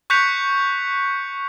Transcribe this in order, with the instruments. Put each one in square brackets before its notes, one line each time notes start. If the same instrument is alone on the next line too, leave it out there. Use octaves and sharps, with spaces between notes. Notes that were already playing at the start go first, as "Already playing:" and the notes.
[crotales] C#6 F#6 G6 B6 C#7 F7